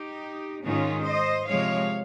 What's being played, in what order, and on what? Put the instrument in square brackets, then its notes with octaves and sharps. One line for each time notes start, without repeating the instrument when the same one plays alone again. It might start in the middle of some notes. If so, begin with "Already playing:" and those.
Already playing: [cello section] D#4 G4
G#2 D#3 G#3 C#4 F4
C5 D#5
C3 F3 G#3 C#5 F5